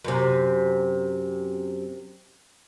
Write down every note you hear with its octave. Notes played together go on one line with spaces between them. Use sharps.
F#2 C3